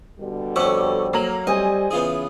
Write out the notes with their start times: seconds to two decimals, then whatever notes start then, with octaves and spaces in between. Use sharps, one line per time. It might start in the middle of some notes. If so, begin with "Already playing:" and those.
0.20 B2 D3 G3
0.56 F2 C#4 F#5 C#6 D6 E6
1.13 F#3 A#3 A#5 F#7
1.47 G3 C4 D#5 G#5
1.91 C#3 E3 B3 F4 G#4